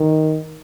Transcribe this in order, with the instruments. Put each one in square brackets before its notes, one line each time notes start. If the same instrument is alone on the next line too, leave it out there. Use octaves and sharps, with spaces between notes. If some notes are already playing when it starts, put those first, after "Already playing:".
Already playing: [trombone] D#3